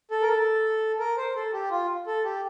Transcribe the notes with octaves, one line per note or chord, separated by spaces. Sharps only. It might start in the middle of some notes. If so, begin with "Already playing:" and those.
A4
A#4
A4
A#4
C5
A4
G4
F4
A4
G4